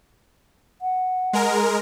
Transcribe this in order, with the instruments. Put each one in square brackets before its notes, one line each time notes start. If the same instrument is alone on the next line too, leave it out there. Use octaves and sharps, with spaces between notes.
[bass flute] F#5
[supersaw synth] G#3 A#4